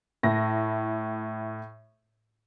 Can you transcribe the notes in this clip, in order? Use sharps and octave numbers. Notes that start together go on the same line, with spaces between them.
A2 E4 A#6